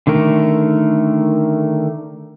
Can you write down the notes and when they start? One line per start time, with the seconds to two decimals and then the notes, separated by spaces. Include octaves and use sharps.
0.07 D3 D#3 A3 A#4